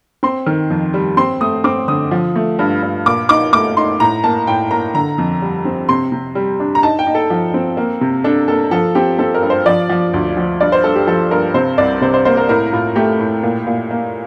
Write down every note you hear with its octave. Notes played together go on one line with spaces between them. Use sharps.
C4 C6
D#3
F2
G3
C4 C6
A3 D#6
C4 D6
D3 D#6
F3
A3
G2
G2
A#2 D6
D#4 D6
A3 D6
D#4 C6
A2 A#5
A#3 A5
A2 G5
A#3 A#5
D3 A#5
F2
G3
C4
C3 C6
C3
G3
D4
A#5
D#4 A5
G5
D#4
A4
F3
C4
A#3
C3
D4 A4
A#3 A4
F3 A4
C4 G4
C4 A4
A#4
G2
C5
F3 D5
F3
D2
F3
G2 D5
C5
G2 A4
G4
F3 A4
G2 A#4
C3 C5
C2 D5
C3 C5
C5
A#3 C5
A#4
A2 A#4
A2 F4
A3 G4
A2
A#2
A#2
A#3